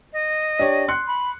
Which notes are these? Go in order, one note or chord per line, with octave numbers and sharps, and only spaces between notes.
D#5
D4 G4 C#5
C6 F#6 C#7
B5